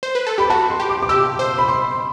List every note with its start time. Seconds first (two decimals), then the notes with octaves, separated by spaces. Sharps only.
0.03 C5
0.15 B4
0.27 A4
0.38 G4 B5
0.50 F#4 A5
0.70 C6
0.80 G4
0.89 D6
1.02 D6
1.09 G4 E6
1.39 C5
1.58 B5
1.68 C6